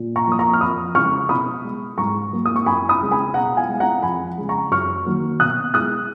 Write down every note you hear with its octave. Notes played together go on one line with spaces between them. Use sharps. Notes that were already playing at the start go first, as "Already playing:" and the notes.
Already playing: A#2
A#5 C#6
F3 A#3 D#6
A#5 C#6
F6
F2 B5 D#6
C#3 F3 G#3 C#6 F6
B2 B5 D#6
G#3
G#2 A#5 C#6
F#3 A#3
D#6
C#6
F#2 G#5 B5
B5 D#6
C#3 G#3
G#5 B5
B2 F#5 A#5
F5 G#5
G#3
F#5 A#5
F2 G#5 B5
C#3 G#3
A#5 C#6
F#2 C#6 F6
D#3 F#3 A#3
B2 D#6 F#6
G#3 D#6 F#6